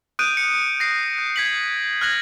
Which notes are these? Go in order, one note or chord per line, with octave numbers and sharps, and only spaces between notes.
D#6 F#6 G6 D7 D#7
C#7
A#6 C7
G6
G#6 B6 F#7
F6 F#6 G#6 A#6 F#7